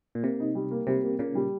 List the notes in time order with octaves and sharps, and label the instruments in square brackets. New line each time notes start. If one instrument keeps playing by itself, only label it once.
[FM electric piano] A#2
[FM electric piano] C3 [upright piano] A#3
[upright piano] D#4
G3
A#3
[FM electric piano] C3 [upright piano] G3
[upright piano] A#3
[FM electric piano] A#2 C#3 [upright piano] A#3
[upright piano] G3